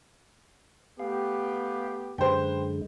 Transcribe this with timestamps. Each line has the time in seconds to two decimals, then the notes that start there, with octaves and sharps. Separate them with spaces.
1.00 A3 B3 G4 F5
2.18 F#2 D3 G#3 B4 C5 G5